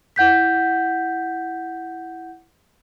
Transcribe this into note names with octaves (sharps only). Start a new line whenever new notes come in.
E4 F#5 G6 B6